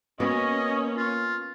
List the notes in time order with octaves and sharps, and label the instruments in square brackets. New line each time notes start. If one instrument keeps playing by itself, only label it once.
[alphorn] A#3 [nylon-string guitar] B3 F#4 [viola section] C#4 [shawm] D#5
[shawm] F4